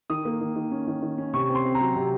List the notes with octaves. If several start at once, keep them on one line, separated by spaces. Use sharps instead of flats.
D#3 D#6
A#3
D#3
D#3
C#4
D#3
D#3
C#4
C3 C#6
C4
C6
C4
A#5
F#3
C3